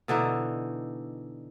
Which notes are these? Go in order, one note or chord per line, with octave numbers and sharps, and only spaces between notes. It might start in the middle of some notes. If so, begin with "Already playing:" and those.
B2 D3 E3 D#4